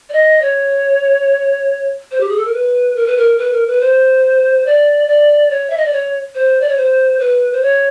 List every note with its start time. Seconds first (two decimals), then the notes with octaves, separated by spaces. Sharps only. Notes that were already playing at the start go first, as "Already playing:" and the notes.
0.09 D5
0.13 D#5
0.42 C#5
2.11 C5
2.20 G4
2.29 G#4
2.37 A4
2.45 A#4
2.53 B4
2.96 A#4
3.06 B4
3.17 A#4
3.38 B4
3.52 A#4
3.67 B4
3.81 C5
4.66 D5
5.08 D5
5.50 C#5
5.70 E5
5.77 D#5
5.85 D5
5.93 C#5
6.35 C5
6.61 D5
6.68 C#5
6.77 C5
7.20 B4
7.53 C5
7.62 C#5